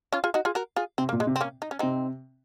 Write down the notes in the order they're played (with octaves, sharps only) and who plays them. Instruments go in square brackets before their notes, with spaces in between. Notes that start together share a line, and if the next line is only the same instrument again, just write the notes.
[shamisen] C#4 F4
F4 G#4
D#4 F#4
F4 G#4
F#4 A#4
F4 G#4
[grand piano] C3 [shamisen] C4
[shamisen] A#3
[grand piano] A#2
[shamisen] G#3
[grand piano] C3
[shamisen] C4
A#3 C#4
D#4
C#4
[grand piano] C3 [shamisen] C4 D#4